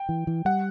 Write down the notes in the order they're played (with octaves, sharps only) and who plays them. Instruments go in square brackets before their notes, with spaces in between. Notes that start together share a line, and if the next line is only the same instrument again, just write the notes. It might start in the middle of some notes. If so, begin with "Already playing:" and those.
Already playing: [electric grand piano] G5
[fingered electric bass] E3
E3
[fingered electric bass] G3 [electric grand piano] F#5